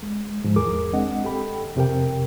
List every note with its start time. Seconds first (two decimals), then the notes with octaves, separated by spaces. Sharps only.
0.03 G#3
0.44 G#2 F3 G#3
0.56 E2 G#4 A#4 D6
0.93 G#3 C4 D4 D#5 F#5
1.24 G4 A4 G5 B5
1.76 F2 C3 G4 A#4 G5